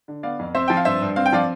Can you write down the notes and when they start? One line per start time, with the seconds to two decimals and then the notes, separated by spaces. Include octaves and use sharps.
0.08 D3
0.23 B3 D5 F5
0.39 F2
0.55 C4 C5 E5
0.68 F3 G5
0.77 F5
0.85 G2 C5 E5
1.01 G2
1.16 C4 F5
1.26 G5
1.33 F3 D5 F5